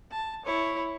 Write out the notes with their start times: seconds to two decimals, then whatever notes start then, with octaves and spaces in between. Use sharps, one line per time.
0.11 A5
0.45 E4 C#5